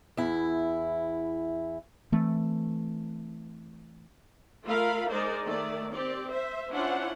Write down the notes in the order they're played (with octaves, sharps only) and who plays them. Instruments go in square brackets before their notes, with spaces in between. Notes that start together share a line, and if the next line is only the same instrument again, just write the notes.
[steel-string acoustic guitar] E2 E4
[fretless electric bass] E3 A3 C4
[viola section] A3 F4 A#4 F5 B5
G#3 D#4 A#4 C5 D5
D#3 A3 D5
C4 G4 D5
C5 E5
C#4 D4 E4 F4 C5 F#5